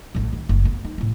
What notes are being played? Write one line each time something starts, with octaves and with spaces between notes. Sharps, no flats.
A1 A2
D#3
F#1
B3
D#4
A1 A2